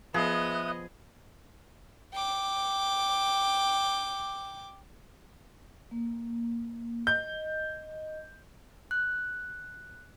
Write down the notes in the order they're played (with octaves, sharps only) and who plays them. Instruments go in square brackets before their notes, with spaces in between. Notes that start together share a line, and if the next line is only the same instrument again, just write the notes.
[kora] F3 [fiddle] B3 D#5 [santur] G#4 [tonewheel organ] E5 D#6 F#6
[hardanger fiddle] G5 D6
[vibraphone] A#3
[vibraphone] D#5 [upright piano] G6
[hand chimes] F#6